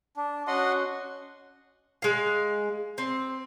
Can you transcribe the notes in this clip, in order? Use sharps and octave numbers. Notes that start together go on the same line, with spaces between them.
D4
C#4 F#4 D#5 F#5 C6
G#3 F5
C4